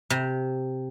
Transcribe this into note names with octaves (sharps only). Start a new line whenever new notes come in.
C3